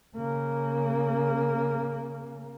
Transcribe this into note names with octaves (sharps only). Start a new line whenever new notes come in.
C#3 A#3